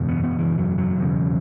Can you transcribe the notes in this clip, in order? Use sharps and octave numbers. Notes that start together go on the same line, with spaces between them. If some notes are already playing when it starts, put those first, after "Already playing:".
Already playing: F#1 E2 B2
B3
B3
E3
F#3
F#3
E1 E2 C#3